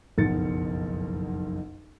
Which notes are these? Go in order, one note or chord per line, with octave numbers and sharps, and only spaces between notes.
F#1 B1 F2 B2 A6 C#7